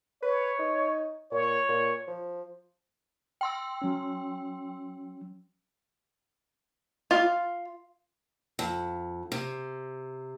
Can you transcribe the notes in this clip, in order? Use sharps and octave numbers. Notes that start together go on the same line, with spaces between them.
B4 C#5
D#4
A#2 C#5
A#2
F3
G5 C6 E6
F#3 C#4
F4 F5
F2
C3